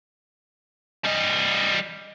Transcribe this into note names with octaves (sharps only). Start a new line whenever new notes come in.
G3 D#5